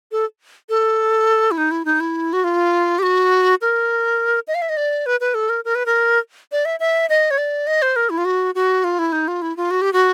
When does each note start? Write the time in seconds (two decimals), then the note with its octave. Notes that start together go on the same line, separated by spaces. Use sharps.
0.12 A4
0.69 A4
1.51 E4
1.58 D#4
1.71 E4
1.85 D#4
2.00 E4
2.33 F#4
2.44 F4
2.99 G4
3.03 F#4
3.61 A#4
4.48 D#5
4.55 F5
4.62 E5
4.69 D#5
4.77 D5
5.06 B4
5.20 B4
5.34 A4
5.49 A#4
5.65 A#4
5.75 B4
5.86 A#4
6.52 D5
6.65 E5
6.80 E5
7.09 D#5
7.31 C#5
7.38 D5
7.67 D#5
7.82 C5
7.96 A#4
8.10 E4
8.18 F4
8.25 F#4
8.55 F#4
8.84 F4
8.99 E4
9.12 D#4
9.28 F4
9.42 E4
9.57 F4
9.71 F#4
9.82 G4
9.93 F#4